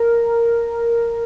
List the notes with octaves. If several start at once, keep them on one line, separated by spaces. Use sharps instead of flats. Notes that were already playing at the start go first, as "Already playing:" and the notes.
Already playing: A#4